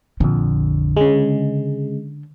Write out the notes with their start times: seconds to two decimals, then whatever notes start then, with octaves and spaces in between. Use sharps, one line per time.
0.20 A#1 F2 D3
0.97 C#3 G#3